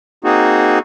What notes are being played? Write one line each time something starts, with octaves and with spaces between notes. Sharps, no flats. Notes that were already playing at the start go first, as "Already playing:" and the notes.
A#3 C4 D#4 F#4 G#4